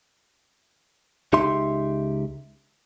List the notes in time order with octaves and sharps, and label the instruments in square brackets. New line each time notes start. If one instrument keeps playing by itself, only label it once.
[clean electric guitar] C#2 D#4 G4 E5 C6